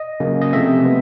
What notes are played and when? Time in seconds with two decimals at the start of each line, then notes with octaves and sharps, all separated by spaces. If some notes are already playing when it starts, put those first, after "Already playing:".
Already playing: D#5
0.20 C#3 F#3 A#3 C#4
0.42 D#5
0.53 C3 F3 A3 C4 E5
0.85 B3